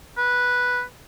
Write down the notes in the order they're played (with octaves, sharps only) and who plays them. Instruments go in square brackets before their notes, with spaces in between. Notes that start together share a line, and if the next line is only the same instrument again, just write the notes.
[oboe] B4